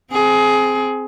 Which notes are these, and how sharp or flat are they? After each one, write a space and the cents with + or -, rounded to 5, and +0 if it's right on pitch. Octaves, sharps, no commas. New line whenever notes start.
C4 +0 G#4 +20